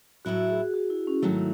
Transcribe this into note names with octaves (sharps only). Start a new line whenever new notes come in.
A2 F#3 A3 E4 F#4
G#4
F#4
E4
C#4
G#2 D#3 F#3 A3 E4